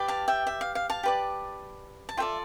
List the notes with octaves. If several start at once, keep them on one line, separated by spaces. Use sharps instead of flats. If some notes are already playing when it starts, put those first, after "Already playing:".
Already playing: G4 B4 D5
F5 A5
E5 G5
E5
F5
F5
F5 A5
G4 B4 D5
A5
F4 A4 D5 E5 G5